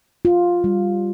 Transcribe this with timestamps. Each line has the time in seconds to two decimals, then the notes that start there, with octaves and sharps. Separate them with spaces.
0.25 F4
0.64 G3